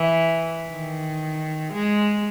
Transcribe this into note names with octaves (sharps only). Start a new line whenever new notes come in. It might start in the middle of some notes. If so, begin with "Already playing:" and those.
Already playing: E3
D#3
G#3